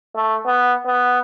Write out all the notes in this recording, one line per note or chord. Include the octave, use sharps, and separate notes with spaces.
A3
B3
B3